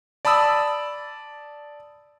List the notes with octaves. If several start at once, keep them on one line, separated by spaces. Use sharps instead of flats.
D5 A5 B5 D#6 E6